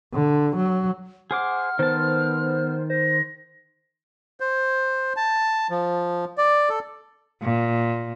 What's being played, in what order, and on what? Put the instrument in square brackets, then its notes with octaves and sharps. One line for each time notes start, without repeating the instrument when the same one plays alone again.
[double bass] D3
F#3
[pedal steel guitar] G#4 C5 D6 [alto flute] F#5 [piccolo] F6
[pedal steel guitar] D#3 A5 [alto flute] B3 [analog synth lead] C5
[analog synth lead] C5 [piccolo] A#6
[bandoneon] C5
A5
F3
D5
A4
[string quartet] A#2